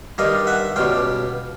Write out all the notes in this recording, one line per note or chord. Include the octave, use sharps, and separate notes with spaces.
G2 D#3 G3 D#5 F5
E5 F#5
C#2 B2 G3 F5 G5